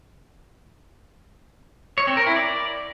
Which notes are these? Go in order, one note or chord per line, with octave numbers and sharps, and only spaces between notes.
C#5
C4
A#4
E4
D5